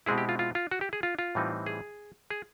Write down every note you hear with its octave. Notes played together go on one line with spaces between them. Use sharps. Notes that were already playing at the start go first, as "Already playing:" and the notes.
B2 G#3 C4 E4 G#4
G4
F4
F4
F4
F#4
G4
G#4
F4
F4
A2 E3 G3 C4 D#4
G#4
G#4